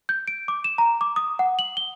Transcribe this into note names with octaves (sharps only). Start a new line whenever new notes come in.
G6
D7
D6
E7
A#5
D6
D#6
F#5
F#7
G7